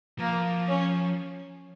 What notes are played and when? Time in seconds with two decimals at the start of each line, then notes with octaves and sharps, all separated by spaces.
0.19 F3 A#3
0.68 C#4